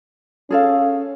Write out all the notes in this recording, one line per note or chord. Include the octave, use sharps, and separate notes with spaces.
C#4 G#4 A4 F5